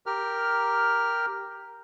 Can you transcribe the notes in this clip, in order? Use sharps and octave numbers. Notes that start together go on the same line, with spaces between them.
G4 A#4 F6